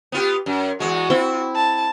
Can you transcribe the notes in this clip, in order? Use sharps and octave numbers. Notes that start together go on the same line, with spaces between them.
B3 F4 G4
F#2
E2 G2 G#3 F#4
C4 E4
A5